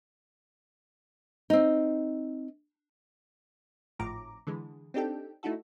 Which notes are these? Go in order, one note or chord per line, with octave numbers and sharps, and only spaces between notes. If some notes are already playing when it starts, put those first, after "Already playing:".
C4 D#4
G#1 A2 F3 A#5 D6
D3 E3 G#3
C4 D4 D#4 G4 A4 G5
A3 D#4 E4 F#4 A4